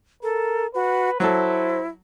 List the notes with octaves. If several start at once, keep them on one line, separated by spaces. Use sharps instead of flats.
A4 A#4
F#4 B4
F#3 E4 A4 C5